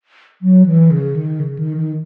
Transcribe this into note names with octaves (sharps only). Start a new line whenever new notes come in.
F#3
E3
C#3
D#3
C#3
D#3
D#3